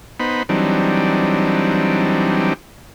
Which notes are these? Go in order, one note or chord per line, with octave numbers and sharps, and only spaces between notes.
B3 D#4 C5 B5
E3 F#3 G3 C4 D4 D#4